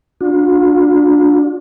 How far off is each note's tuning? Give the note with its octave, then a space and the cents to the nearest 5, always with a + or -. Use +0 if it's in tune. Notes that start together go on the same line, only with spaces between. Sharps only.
D4 +0 F4 +45